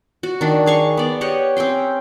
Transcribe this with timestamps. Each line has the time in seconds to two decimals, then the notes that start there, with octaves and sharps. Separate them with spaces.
0.23 F#4
0.41 D#3 D4
0.66 G#4 F5 C#6
0.97 B3 D5
1.21 G4 C#5 D#5 F#5
1.57 C4 C#4 G5 C6